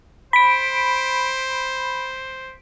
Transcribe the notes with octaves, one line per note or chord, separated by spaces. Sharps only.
C5 B5 B6 D7